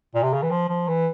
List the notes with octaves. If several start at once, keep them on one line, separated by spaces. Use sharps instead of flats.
A#2
C3
C#3
E3
F3
F3
E3